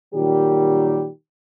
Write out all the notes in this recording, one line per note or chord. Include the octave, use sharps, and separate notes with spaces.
A#2 D#3 F#3 G3 G4